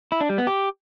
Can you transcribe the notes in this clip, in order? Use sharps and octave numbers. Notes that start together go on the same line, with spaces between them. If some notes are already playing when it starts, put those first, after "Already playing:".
E4
D4
G3
B3
G4